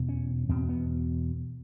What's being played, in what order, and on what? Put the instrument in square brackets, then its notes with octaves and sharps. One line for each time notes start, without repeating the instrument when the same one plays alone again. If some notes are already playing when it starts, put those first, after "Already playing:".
Already playing: [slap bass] E2 B2
C#4
E2 B2 C4
B3